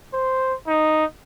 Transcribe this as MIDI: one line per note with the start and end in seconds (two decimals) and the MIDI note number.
0.14 0.54 72
0.67 1.05 63